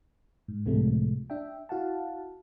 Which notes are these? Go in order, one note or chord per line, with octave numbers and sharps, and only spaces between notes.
G#2
C#2 A2 C3 F3 G#3 A3
D4 E5 G5
E4 F#4 F5 F#5 A5